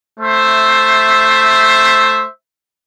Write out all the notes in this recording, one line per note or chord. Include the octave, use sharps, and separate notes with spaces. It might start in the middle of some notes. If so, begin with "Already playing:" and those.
A3 C5 E5